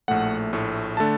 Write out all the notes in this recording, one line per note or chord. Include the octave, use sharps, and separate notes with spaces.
A#1 A2 A3 F#5
A#1 A2 A3
D3 A3 D4 A5